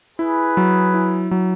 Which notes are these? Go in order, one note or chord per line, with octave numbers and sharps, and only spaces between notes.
E4 G#4 B4
F#3
E4
F#3